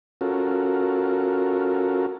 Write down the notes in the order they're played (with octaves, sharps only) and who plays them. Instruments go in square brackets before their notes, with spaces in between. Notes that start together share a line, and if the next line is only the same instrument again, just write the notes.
[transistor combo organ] C#4 F4 F#4 A4 A#4